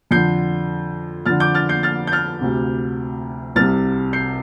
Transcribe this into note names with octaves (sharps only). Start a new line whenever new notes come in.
F2 D3 G6 C7
F2 D3 F6 A6
D6 G6
F6 A6
G6 C7
F6 A6
G6
F6 A6
D2 C3
C2 C3 F6 A6
G6 C7